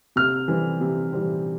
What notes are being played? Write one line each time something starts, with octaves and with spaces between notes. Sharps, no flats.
C3 F6
E3 G3 C4
C3
E3 G3 C4